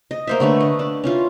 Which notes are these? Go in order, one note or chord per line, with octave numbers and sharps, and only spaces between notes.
D#5
A#3 C5 E5
D3 A3 B4 C#5
D#5
D4
C#4 E4 F4